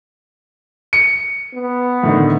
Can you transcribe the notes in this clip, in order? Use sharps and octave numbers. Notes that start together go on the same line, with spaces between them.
C#7
B3
A2 D3 D#3